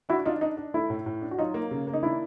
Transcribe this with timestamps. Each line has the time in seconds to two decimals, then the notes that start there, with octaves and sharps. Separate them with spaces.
0.09 D4 E4 F#4
0.25 D4 D#4 F4
0.41 D4 D#4
0.57 D4
0.74 A3 E4
0.90 A2
1.06 A2
1.22 D4
1.31 F#4
1.38 F#3 D#4 F4
1.54 A#3
1.71 C#3
1.87 A#3
1.93 D#4
2.03 D4 E4